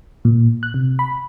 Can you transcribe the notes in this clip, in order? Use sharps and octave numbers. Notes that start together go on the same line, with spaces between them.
A#2
F#6
C3
B5